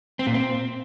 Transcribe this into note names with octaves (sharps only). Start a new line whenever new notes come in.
C4
A#2
C4